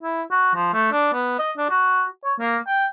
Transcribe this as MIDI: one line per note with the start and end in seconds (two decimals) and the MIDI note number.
0.03 0.22 64
0.31 0.53 66
0.55 0.72 53
0.73 0.91 57
0.91 1.09 62
1.13 1.35 59
1.39 1.52 75
1.57 1.68 62
1.70 2.05 66
2.24 2.34 73
2.39 2.57 58
2.67 2.85 79